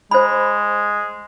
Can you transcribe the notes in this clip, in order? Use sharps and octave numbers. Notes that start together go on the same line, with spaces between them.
G#3 C5 B5